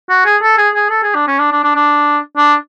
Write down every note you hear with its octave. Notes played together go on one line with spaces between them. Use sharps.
F#4
G#4
A4
G#4
G#4
A4
G#4
D4
C#4
D4
D4
D4
D4
D4